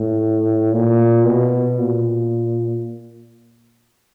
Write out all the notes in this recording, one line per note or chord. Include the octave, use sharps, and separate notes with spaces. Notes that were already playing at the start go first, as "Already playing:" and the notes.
Already playing: A2
A#2
B2
A#2